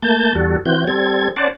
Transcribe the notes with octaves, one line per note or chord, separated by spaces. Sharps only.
A3 A#3 A5 G6
E2 G3 F#4 A4
E3 C4 F#4 G6
G3 C4 A4 G#6
C#4 C5 D5 F#5 A5